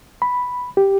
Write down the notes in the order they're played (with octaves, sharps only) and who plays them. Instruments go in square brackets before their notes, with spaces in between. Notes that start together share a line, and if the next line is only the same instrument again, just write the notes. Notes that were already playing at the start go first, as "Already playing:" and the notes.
[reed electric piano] B5
G4